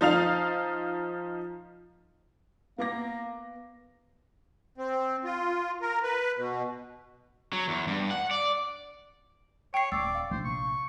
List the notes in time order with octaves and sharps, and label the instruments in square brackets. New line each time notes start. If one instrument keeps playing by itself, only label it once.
[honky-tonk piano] F3 D#4 F5 F7
[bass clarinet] A#3 [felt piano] B3 D6 A#6
[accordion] C4
F4
A#4
B4
B2
[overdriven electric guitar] F#3
E2
G2
F#5
D5
[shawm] C#5 [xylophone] G5 C7
[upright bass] D#1 [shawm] D5 [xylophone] E6
[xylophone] F5
[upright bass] A#1 C3 [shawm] C5
[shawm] C#6